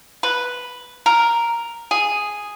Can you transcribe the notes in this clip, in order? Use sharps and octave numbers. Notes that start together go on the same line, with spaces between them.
B4
A#4
G#4